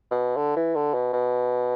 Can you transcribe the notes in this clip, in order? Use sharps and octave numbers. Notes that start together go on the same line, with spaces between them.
B2
D3
E3
D3
B2
B2